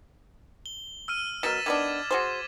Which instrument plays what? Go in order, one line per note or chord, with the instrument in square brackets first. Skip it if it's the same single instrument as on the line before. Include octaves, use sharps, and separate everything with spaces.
[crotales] G7
E6 F6 D#7
[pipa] B2 F#3 A#4 [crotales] A6 B6 E7
[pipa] D#3 B3 D4 [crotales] D6 G#6
[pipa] F#4 G#4 C5 [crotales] D6